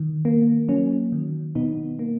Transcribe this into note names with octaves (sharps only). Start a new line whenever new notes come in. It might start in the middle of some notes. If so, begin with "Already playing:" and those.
Already playing: D#3
A#3
F#3 C#4
D#3
B2 B3 D#4
A#3